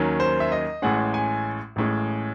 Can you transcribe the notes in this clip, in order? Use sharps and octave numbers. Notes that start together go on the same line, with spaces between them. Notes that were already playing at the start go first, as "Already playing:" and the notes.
Already playing: D#2 D#3 F#3 C#4
C5
E5
D#5
A1 A2 G#3 C#4 F#5
G#5
A1 A2 G#3 C#4